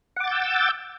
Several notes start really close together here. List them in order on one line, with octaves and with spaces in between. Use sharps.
F#5 D6 A6 G6 E6